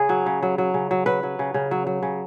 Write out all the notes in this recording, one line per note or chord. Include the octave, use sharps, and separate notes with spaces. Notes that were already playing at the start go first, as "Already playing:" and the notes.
Already playing: C#3 G#4
F#3
C#3
F#3
F#3
C#3
F#3
F#3 B4
F#3
C#3
C#3
F#3
F#3
C#3